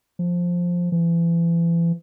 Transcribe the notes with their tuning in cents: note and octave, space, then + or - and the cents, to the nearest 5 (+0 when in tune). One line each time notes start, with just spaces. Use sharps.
F3 +5
E3 +35